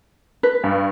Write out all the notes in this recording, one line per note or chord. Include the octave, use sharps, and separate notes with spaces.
B4
G2